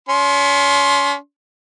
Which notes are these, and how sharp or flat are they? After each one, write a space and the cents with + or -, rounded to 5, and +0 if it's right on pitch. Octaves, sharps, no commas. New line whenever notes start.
C#4 +35 C6 +15